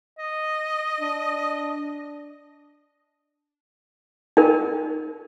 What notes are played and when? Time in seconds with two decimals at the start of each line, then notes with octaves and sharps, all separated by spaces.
0.19 D#5
1.00 D4
4.37 D#4 A#4